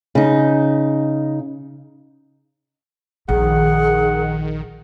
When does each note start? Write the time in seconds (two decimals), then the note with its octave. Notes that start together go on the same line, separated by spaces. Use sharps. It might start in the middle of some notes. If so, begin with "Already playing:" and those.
0.15 C#3 D#4
3.29 A#1 D#3 G#4 F#5